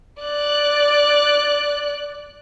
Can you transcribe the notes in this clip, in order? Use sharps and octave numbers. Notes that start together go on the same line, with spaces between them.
D5 F#6